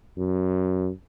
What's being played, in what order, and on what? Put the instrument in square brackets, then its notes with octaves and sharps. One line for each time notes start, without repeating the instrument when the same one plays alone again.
[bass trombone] F#2